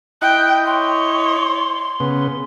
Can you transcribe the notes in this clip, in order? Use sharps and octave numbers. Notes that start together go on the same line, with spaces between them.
E4 D#5 G5 F#6
C#5 C6
C#3 B3